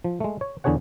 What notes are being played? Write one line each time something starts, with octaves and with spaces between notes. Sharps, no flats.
F3
G#3 A3
C#5
E2 D3 D4 G#4 C#5 F#5